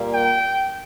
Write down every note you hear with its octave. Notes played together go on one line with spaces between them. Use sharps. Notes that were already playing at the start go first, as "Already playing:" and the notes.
Already playing: A#2 G3 A#3
G5